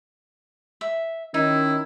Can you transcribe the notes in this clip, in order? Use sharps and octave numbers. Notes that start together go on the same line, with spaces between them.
E5
D#3 C#4 D#4 E4